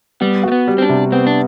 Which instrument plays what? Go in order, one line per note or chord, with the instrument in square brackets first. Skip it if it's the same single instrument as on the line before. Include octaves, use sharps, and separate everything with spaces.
[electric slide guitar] G3 [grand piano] B3
[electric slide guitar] A3 [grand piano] F#4
[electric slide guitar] B3
[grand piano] G3
[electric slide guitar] C4
D4
[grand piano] C3
[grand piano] B3 [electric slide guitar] C4
[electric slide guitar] D4